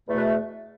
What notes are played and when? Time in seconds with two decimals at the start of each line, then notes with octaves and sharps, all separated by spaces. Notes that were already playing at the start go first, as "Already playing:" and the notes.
0.08 E2 B2 A3
0.18 B4